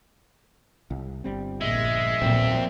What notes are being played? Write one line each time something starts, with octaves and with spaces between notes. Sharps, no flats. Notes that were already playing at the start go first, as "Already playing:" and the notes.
C2
G1 G3 C4
A#1 G#3 E5
D#1 B1 F2 A#2 F3 C4